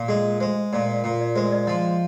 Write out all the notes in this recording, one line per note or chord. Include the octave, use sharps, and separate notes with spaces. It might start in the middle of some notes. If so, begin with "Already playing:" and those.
Already playing: A#2
G#3 G#4
G#3 C5
A#2 D5
A#2
D5
G#3 C5
D5
F3 D#5